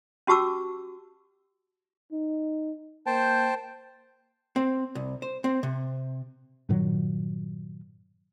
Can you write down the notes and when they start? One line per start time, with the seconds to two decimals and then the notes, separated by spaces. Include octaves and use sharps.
0.27 C#4 F#4 G4 A5 D6 E6
2.12 D#4
3.06 A#3 C5 G5 A5
4.56 C4
4.95 C2
5.22 C5
5.44 C4
5.63 C3
6.69 G2 A#2 D#3 F#3